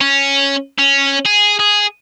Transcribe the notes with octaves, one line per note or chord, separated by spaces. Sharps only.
C#4
C#4
G#4
G#4